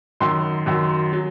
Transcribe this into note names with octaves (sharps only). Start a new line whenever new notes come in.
F#2 D#3 F#3 C6
F#2 D#3 F#3
F#3